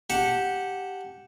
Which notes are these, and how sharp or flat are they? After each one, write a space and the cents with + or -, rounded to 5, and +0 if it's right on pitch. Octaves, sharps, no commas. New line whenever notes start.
G4 -5 F#5 -10 A5 +0